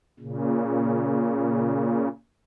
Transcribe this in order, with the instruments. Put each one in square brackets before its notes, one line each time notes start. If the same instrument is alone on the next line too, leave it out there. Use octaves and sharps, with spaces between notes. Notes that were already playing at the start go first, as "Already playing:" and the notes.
[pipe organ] A#2 C#3